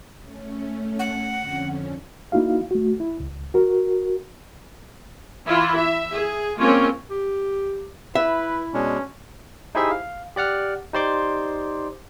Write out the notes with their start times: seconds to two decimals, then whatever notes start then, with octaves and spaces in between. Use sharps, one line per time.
0.21 A3 C#4
0.99 F#5
1.37 F2 D3 C#4
2.32 A#3 D#4 E4 F#4 F5
2.71 A3 F#4
3.00 E4
3.20 C#2
3.54 F#4 A#4
5.47 E3 E4 F4
5.78 E5
6.12 G#4
6.57 G#3 A#3 C4 C#4 F4 C#5
7.10 G4
8.15 E4 B4 E5
8.74 B2 G#3 C#4 D4
9.75 D#4 E4 G4 G#4 C5 E5
9.91 F5
10.36 G4 D5 F#5 F6
10.93 D#4 G4 C5 D5 C6 D6